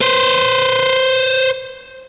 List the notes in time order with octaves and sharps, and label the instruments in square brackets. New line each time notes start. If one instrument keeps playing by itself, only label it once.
[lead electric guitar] B4 C5